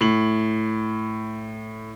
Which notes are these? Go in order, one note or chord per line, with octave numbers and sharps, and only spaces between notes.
A2 F#7